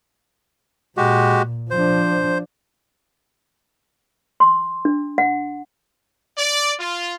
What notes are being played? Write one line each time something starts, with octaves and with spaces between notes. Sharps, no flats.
A#2 G#3 F#4 G4
F3 D4 C5
C6
D4
F#5
D5
F4